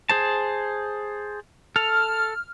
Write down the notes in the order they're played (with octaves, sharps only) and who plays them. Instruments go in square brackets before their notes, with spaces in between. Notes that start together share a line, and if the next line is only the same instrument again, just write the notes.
[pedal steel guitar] G#4 C5 A5
[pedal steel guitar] A4 [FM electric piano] F6